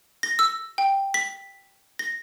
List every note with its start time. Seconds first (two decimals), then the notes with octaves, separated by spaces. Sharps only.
0.23 A#6
0.39 E6
0.78 G5
1.14 B6
1.99 A#6